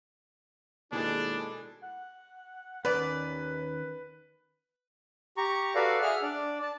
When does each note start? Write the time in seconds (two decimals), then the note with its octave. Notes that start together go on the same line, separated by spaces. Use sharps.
0.92 D#2 B2 G#3 D4 E4 G#4 A4
1.83 F#5
2.85 D#2 D#3 B3 C#4 B4 D5
5.37 G4 A#5 C#6
5.75 F#4 A4 B4 D5 F5
6.02 G#4 E5 F#5 F6
6.22 D4 D5
6.63 A5